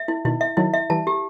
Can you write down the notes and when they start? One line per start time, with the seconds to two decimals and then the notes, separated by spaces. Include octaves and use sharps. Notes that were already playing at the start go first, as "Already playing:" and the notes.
Already playing: E5
0.08 E4
0.25 B2 D#3 E4
0.41 E5
0.57 D#3 F#3 E4
0.74 E5
0.90 E3 G3 A5
1.07 G4